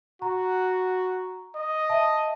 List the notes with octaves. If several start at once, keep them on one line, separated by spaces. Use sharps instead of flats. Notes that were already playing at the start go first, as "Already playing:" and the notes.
F#4 A#5
D#5
E5 A5